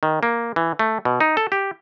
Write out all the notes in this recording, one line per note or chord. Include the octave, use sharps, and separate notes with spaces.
D#3
A#3
E3
A3
B2
D#4
A4
G4